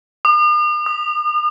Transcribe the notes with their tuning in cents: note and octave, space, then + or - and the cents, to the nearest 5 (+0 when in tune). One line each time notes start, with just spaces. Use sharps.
D#6 -45
D#6 -30